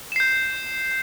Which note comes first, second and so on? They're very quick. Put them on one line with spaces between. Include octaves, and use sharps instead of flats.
E7 C7 G6